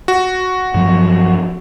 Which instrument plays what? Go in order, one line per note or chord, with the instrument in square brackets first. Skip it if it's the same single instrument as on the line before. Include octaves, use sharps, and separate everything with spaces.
[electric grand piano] F#4
[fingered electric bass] G2 F3 F#3